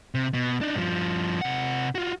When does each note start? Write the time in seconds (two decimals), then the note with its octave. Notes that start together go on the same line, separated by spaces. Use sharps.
0.15 C3
0.34 B2
0.61 D4 D#4
0.75 G2 F3
1.41 C3 F#5
1.95 F4 F#4